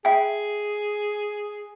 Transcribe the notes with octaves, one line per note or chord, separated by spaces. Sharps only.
G#4 E5 G5